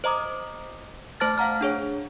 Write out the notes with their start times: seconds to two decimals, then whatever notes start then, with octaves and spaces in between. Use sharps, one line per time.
0.04 C5 D#5 A#5 D6 D#6
1.20 A3 C5 A5 F6 A6
1.38 F5 F#5 A#5 F6
1.61 D4 G#4 C#5